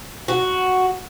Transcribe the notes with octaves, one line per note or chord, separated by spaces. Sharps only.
F#4